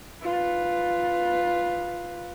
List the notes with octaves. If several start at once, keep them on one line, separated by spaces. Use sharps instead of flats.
F4 B4